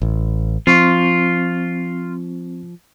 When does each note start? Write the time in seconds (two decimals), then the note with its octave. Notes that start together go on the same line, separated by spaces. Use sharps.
0.02 A1
0.67 F3 C4 F4 C#6